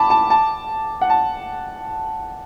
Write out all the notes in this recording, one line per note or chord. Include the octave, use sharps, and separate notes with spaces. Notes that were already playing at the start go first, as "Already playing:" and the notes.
Already playing: A5 B5 D6
A5
A5
F#5
A5